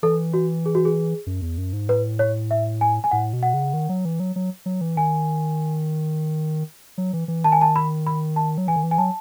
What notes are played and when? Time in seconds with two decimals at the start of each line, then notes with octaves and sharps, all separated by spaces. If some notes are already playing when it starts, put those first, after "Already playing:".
0.03 E3 A4
0.34 F#4
0.66 G#4
0.75 F#4
0.85 G#4
1.27 F#2
1.42 E2
1.58 F#2
1.73 G#2
1.88 A2 B4
2.19 C#5
2.51 E5
2.81 G#5
3.04 G#5
3.11 A2 F#5
3.33 B2
3.43 F#5
3.54 C#3
3.74 D#3
3.89 F#3
4.05 E3
4.20 F#3
4.36 F#3
4.66 F#3
4.81 E3
4.97 D#3 G#5
6.98 F#3
7.13 E3
7.28 E3
7.44 D#3 A5
7.52 G#5
7.61 A5
7.76 B5
8.07 B5
8.36 A5
8.58 F#3
8.68 E3 G#5
8.76 D#3
8.84 E3
8.91 G#5
8.98 F#3 A5